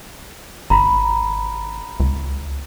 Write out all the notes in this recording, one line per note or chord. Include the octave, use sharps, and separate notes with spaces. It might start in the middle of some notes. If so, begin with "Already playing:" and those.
G#1 A#5 B5
C#2